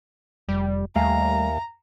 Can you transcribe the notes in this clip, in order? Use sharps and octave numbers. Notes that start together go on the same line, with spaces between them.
F1 G3
D#2 G3 A3 E5 F5 G#5 A#5